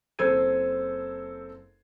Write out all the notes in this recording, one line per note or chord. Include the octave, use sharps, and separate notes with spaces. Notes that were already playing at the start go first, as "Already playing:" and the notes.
F#1 C4 A4 C5 G#6 D#7